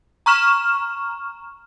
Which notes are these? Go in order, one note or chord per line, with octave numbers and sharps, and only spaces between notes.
A#5 C#6 F6 E7